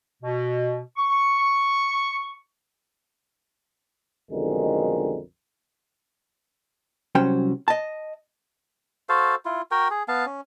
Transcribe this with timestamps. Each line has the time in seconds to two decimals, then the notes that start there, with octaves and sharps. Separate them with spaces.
0.22 B2
0.97 C#6
4.31 B1 F2 D3 D#3 G#3 A#4
7.15 C2 F#3 C#4 C5 G5
7.68 D#5 A5
9.09 F#4 A4 C5 F5
9.45 E4 F4
9.71 F#4 A#4 G5
9.91 G#4
10.08 B3 F5 A5
10.26 C#4